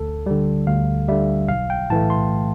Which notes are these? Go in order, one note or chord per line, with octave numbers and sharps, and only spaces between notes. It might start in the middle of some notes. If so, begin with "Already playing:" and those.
Already playing: D2 A4
D3 G3
D2 F5
D3 G3 E5
B1 F5
G5
A2 E3 A3 A5
C6